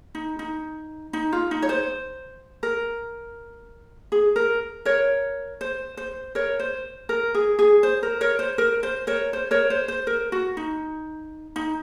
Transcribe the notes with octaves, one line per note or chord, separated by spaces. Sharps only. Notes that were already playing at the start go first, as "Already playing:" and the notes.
D#4
D#4
D#4
F4
D#4
C#5
C5
A#4
G#4
A#4
A#4 C#5
C5
C5
A#4 C#5
C5
A#4
G#4
G#4
C5
A#4
A#4 C#5
C5
A#4
C5
A#4 C#5
C5
A#4 C#5
C5
C5
A#4
F#4
D#4
D#4